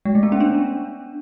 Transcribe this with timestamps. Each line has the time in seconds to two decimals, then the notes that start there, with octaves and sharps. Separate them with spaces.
0.05 G#3
0.15 A3
0.23 B3
0.32 C#4
0.40 D4